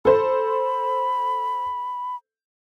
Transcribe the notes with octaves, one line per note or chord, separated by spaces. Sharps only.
A4 C5 B5